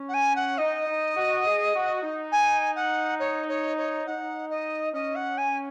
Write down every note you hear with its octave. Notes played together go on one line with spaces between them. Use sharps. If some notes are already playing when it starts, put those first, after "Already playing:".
Already playing: C#4
F#5
G#5
F#5
D#4 D#5
D#4
F#4
G#4
F#4
D#4
G#5
F#5
C#5
C#5
C#5
D#4 F#5
D#5
C#4 D#5
F#5
G#5